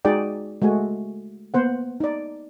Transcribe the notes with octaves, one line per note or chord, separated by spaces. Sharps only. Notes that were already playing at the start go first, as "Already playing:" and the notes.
G#3 D#4 F#4 G#4 D5 G5
G#3 A3 F#4 G#5
A#3 B3 C5 F#5
D#4 D5